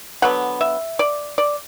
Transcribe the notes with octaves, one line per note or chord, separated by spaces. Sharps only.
D3 F#3 B3 F#5
E5
D5
D5